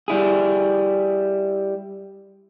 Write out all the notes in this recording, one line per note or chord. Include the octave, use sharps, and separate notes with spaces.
G3 E4 G#4